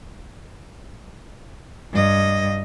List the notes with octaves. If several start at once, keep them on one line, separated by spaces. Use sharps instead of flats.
G2 D#5